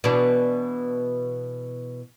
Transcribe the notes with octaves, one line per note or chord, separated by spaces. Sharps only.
B2 E3 D4